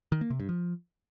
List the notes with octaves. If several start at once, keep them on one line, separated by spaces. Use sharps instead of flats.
D#3
A#3
C3
G2
F3